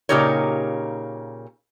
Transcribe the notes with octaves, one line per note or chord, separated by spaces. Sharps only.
A#2 C#3 D#4 G4 A#4 C#5